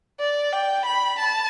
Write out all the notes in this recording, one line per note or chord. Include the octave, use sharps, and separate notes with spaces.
D5
G5
B5
A5